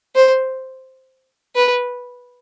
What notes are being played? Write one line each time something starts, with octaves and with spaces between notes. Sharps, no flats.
C5
B4